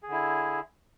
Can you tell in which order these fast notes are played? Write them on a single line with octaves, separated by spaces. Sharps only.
G#4 D3 E4